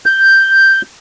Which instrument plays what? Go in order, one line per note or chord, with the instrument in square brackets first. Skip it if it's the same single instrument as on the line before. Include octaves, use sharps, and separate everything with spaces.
[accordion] G6